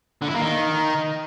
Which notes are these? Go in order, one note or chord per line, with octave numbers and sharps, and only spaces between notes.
D3
E4
A#3
D#3